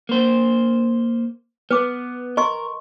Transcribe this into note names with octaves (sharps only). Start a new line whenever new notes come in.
A#3 C5
B3 B4 D6
A#4 D#5 C6 C#6